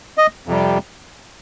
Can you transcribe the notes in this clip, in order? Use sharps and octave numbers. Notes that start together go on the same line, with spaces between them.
D#5
F2 C3 G3